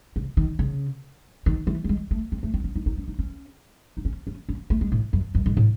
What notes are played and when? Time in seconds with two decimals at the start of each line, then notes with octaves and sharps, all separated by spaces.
0.16 C#3
0.37 D#3
0.59 C#3
1.46 D#3
1.67 E3
1.84 F#3
1.89 G#3
2.11 A3
2.32 C4
2.43 A3
2.54 C4
2.64 C#4
2.76 D#4
2.86 D#4
2.97 C#4
3.08 D#4
3.19 C#4
3.97 D#4
4.05 C#4
4.27 C#4
4.49 C#4
4.70 A3
4.81 G#3
4.92 A2
5.13 F#2
5.35 F#2
5.46 G#2
5.57 A2